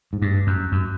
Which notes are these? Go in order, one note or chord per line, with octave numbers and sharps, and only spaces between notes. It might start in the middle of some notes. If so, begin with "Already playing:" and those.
G#2
G2
F#2
F#2